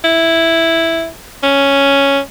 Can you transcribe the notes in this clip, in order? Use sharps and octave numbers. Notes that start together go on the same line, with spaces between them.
E4
C#4